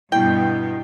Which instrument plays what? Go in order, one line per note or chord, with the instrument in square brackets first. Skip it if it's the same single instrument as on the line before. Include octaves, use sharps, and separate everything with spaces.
[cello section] G2 B2 [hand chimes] E4 G6 [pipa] G5